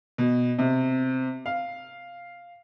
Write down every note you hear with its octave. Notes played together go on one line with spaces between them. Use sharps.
B2
C3
F5